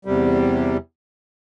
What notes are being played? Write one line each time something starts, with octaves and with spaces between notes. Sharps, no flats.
E2 C3 G3